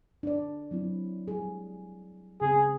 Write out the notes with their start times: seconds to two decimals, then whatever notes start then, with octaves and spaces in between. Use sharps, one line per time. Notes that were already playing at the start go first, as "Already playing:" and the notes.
0.23 D4 D5
0.71 F#3 C4 E4
1.28 G3 G#4
2.41 C#3 C4 G#4